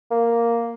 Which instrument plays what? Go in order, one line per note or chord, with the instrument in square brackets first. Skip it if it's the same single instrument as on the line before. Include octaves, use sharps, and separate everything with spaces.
[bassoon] A#3